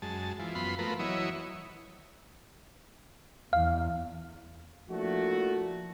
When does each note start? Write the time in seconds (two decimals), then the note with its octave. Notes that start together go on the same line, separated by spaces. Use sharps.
0.02 F#2 G#3 A5
0.39 E3 F3
0.55 F#2 B3 F4 B5 C6
0.79 F3 A3 B3 A#4 B4
0.99 E3 F#3 E4 C#5 D#5
3.53 E2 F5
4.89 F3 A3 A#3 D4 E4 F#4